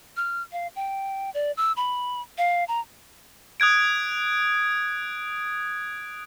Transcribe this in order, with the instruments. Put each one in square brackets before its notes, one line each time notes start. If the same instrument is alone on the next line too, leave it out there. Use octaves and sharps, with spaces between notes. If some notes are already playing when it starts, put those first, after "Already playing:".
[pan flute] F6
F5
G5
D5
E6
B5
F5
A#5
[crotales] D#6 F#6 G#6 D7